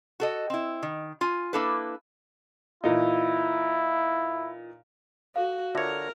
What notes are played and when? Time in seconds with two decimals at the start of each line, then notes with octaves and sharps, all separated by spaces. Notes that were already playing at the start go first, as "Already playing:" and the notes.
0.20 F#4 A4 D#5
0.50 C4 E4
0.83 D#3
1.21 F4 G#5
1.53 A#3 D4 E4 A4 B4
2.84 A#2 E3 D#4 E4
5.36 F#4 A4 F5
5.75 D3 F4 A4 A#4 C#5 E5 A#5